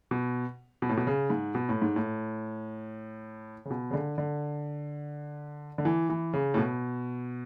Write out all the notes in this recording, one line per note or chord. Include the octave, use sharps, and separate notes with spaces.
B2
B2
A2
B2
C#3
G#2
B2
A2
G#2
A2
C#3
B2
C#3
D3
D3
D3
E3
E3
C#3
A2
B2